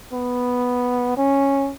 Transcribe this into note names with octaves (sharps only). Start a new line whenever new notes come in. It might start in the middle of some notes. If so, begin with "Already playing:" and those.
B3
C#4